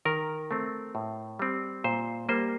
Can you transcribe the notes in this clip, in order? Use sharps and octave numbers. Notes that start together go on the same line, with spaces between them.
D#3 A#4
A3 C4
A2
G3 C4
A#2 C5
G3 A#3 C5